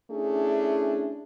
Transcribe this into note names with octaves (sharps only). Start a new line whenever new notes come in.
A3 C#4 D4 E4 G#4